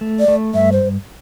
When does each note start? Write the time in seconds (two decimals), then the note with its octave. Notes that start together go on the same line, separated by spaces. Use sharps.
0.01 A3
0.19 D5
0.28 A3
0.54 G2 E5
0.72 C5